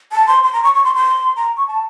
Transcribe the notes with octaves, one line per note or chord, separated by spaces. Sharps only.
A5
C6
C6
A#5
C#6
C#6
C6
C6
A#5
C#6
A5